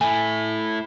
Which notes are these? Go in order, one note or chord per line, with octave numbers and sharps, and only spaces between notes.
A3 E4 G#5